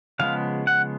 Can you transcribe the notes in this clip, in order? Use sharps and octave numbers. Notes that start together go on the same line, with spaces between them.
C#3 F3 G#3 B3 F5
F#5